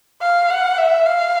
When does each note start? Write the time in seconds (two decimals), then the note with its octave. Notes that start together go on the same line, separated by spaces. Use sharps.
0.21 F5
0.50 F#5
0.78 E5
1.06 F5